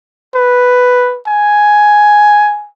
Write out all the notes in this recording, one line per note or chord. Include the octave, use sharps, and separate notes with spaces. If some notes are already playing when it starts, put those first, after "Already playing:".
B4
G#5